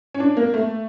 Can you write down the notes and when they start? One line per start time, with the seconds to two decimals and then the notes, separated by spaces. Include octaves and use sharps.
0.14 C#4
0.20 D4
0.37 A#3
0.54 A3